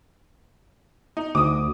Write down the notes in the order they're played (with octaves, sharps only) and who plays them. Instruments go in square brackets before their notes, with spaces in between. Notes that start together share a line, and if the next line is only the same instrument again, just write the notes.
[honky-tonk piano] D#4
[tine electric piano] D2 [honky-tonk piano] D6 D#6